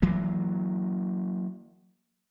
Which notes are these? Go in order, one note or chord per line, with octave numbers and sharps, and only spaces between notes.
E3 F#3 A#3